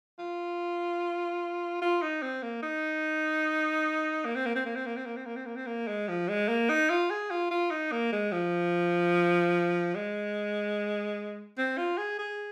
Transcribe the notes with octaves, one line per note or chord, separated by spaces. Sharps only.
F4
F4
D#4
C4
A#3
D#4
A#3
C4
A#3
C4
A#3
C4
A#3
C4
A#3
C4
A#3
C4
A#3
C4
A#3
G#3
F3
G#3
A#3
D#4
F4
G#4
F4
F4
D#4
A#3
G#3
F3
G#3
C4
F4
G#4
G#4